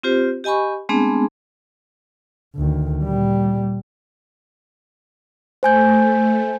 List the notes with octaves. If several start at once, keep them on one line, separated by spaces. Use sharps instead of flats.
C4 F4 G4 C5
G4 D#5 G#5 B5 C#6
G#3 A3 B3 C4 D4 G#4
D2 D#3
A#2 G3
A3 C5 G#5 G6